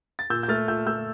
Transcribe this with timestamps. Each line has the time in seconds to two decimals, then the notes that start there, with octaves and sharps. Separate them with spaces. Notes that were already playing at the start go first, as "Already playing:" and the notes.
0.19 A6
0.30 A#2 E6 G6
0.43 G6
0.48 A3 F6 A6
0.68 A#2 E6 G6
0.87 A3 E6 G6